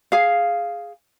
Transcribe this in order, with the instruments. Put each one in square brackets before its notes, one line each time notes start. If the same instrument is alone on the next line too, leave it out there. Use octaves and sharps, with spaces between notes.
[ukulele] G#4 F5